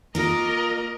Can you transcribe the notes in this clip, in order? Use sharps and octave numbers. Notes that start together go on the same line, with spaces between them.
A#3 F4 A#4 D#5